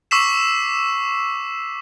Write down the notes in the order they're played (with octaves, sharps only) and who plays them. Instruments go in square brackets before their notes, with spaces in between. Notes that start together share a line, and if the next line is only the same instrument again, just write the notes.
[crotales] C#6 D6 E6 B6 C7 E7